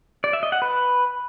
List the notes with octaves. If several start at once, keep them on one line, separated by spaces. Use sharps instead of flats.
D5
E5
D#5
F#5
B4